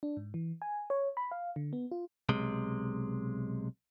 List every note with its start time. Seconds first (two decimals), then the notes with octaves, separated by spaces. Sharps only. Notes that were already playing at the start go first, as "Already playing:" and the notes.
0.03 D4
0.17 G#2
0.34 E3
0.62 G#5
0.90 C#5
1.17 B5
1.31 F5
1.56 D3
1.73 B3
1.91 F4
2.29 B1 C3 G#3